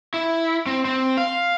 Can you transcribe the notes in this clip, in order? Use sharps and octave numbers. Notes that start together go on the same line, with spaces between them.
E4
C4
C4
F5